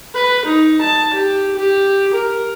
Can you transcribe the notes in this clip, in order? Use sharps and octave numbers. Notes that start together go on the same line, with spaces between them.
B4
D#4
A5
G4
G4
A#4